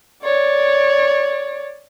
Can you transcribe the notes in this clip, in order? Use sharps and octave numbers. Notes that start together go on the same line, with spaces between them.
C#5 D5